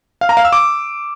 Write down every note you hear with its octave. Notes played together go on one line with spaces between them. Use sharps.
F5
A#5
F5
E6
D6